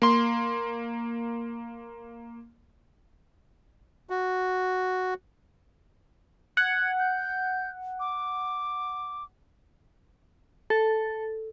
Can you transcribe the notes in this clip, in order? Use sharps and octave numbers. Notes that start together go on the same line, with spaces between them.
A#3 C6
F#4
F#5 G#6
G6
D6
A4